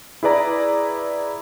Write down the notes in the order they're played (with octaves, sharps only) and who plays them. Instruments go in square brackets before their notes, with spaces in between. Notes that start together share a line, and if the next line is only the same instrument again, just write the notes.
[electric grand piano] E4 G#4 B4 D5 A#5